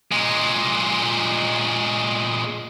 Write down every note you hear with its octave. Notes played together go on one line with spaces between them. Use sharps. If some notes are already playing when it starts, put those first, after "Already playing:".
A#2 G#3